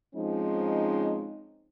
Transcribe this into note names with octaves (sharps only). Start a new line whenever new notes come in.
F3 G#3 C4 C#4 D#4